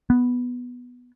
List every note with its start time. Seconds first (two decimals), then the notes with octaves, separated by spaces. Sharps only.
0.10 B3